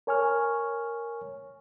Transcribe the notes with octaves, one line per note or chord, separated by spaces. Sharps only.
A#4 C#5 G#5 C#6 F6